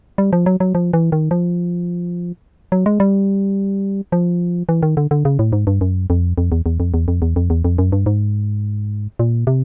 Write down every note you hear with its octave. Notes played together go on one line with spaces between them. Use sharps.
G3
F3
F#3
F#3
F3
E3
D#3
F3
F#3
G#3
G3
F3
E3
D#3
D3
D3
C#3
A2
G#2
G2
F#2
F2
F2
E2
E2
F2
E2
F2
E2
F2
E2
F2
F#2
G2
G#2
A#2
C3